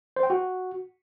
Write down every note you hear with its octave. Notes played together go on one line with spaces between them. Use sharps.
C5
G5
F#4